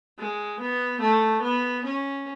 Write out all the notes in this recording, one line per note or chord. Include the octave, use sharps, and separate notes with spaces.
G#3
B3
A3
B3
C#4